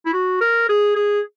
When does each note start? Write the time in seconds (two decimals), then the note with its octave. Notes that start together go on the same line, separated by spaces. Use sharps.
0.06 E4
0.13 F#4
0.41 A#4
0.69 G#4
0.96 G#4